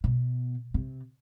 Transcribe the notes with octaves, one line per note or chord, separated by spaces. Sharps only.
B2
C3